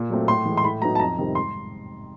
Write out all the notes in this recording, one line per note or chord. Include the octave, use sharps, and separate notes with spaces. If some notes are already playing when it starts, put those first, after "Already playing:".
Already playing: A#2
F#3 A3 C4
A2 C6
E3 G#3
C6
A2 B5
F#3 B3 D#4 A#5
A5
F2 A#5
C3 D#3 G3 C4
G#2 C6